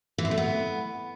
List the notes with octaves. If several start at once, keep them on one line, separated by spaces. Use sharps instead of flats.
E3
C4
A3
B3